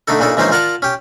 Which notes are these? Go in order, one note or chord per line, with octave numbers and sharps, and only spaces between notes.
D3 A3 D4 D#4 A4
A#2 C#3 D4 D#4 A4
A#1 E3 G#3 C#4 D#4 C5
F4 A#4 D5 F#5 A5 A#5
C#4 G4